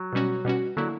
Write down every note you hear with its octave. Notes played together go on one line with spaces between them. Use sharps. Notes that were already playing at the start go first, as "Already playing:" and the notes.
Already playing: F#3
B2 G3 C#4 F#4
B2 G3 C#4 F#4
D3 F#3 A#3 E4